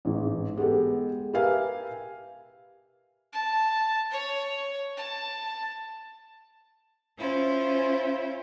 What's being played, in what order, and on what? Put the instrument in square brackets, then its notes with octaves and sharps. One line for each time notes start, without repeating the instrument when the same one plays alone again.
[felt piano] A1 G#2
G#3 B3 G4 A4
G4 A#4 B4 E5 F5 G#5
[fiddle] A5
C#5
A5
[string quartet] C#4 E4 F4 C5